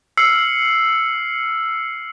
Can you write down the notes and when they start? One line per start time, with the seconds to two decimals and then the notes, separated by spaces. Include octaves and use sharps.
0.17 E6 F6 C7 C#7